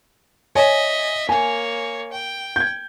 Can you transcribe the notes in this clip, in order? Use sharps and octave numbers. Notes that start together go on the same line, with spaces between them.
C#5 D#5 E5 G#5
A#3 C#5 G#5
G5
G6 G#6